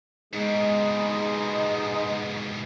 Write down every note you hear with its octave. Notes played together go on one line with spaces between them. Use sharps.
G#2 B2 G#3 D#4 G#4